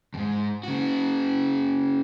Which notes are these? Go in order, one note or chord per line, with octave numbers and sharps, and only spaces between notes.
E2 G#2
C#3 F#4